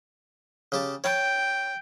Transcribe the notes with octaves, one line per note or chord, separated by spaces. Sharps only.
C#3 G4 A5
C#5 G5 A5